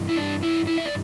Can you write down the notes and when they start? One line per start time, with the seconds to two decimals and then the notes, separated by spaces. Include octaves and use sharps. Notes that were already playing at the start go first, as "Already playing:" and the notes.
Already playing: G2 E3
0.09 E4
0.16 D4
0.43 E4
0.67 E4
0.78 E5
0.85 D5